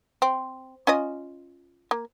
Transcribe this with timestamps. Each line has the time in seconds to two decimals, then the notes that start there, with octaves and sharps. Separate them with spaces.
0.22 C4
0.87 C#4 F4 D#5
1.91 A#3